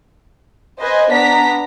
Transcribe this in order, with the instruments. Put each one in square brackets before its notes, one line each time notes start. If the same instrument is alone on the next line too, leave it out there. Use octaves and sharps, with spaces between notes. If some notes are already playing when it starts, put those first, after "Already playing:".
[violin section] B4 C5 D#5 G#5
B3 D4 A#5 B6